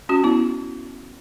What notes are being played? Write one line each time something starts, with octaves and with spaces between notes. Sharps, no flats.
C#4 F#4
B3 E4